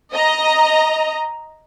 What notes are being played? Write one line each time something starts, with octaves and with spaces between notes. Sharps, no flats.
D#5 A#5